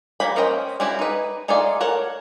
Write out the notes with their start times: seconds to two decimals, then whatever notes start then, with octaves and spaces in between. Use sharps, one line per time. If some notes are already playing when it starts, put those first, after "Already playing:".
0.20 F#3 A#3 G5 B5
0.36 C#4 A#4 C5 D#5 G5
0.80 G#3 C#4 E4 F#4 G4
0.99 D#4 B4
1.48 A3 D#4 F4 G#4 D5
1.80 A4 A#4 C#5 F#5 A5